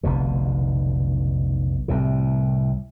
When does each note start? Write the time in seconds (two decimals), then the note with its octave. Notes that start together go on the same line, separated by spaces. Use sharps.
0.03 F1 B1 B2 D3
1.88 C2 A2 C3